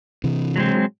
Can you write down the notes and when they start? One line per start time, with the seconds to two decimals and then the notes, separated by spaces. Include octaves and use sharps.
0.24 C3 E3
0.56 F#3 G#3 C4